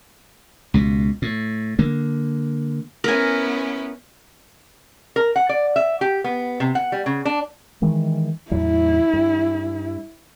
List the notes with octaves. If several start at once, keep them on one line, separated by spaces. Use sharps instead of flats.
C#2 B2
A2
D3 A#3
B3 C#4 E4 A#4 G#5
A#4
F#5
D5
E5
G4
B3
C3
F#5
G3
C#3
D4
D#3 E3 G#3
E2 A2 F#3 E4
G2